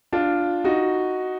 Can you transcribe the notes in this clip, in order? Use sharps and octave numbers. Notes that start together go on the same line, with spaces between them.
D4 F4
D#4 F#4